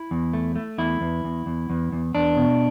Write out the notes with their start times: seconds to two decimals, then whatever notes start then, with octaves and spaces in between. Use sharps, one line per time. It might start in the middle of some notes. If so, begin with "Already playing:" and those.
Already playing: E4
0.11 E2
0.33 A3
0.56 A3
0.78 E2 E4
1.01 E2
1.24 E2
1.46 E2
1.70 E2
1.92 E2
2.15 E2 D4
2.37 B2